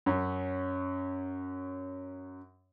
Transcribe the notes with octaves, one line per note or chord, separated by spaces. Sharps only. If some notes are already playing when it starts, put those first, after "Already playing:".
F#2 C#4